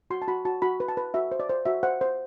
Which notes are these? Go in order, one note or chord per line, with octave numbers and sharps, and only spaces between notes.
F#4 C6
A5
F#4 B5
F#4 A5
F#4 B5
B4
A5
B4
F#4 E5
C5
D5
C5
F#4 E5
C5 F#5
C5